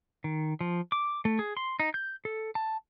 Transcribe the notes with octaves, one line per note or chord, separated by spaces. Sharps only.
D#3
F3
D6
A3
G#4
C6
D#4
G6
A4
A5